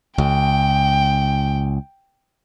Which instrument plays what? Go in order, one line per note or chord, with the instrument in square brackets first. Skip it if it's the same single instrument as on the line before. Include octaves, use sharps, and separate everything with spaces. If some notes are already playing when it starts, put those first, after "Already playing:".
[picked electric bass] C#2 [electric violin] G5